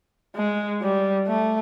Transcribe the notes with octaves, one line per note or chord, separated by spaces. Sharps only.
G#3
G3
A3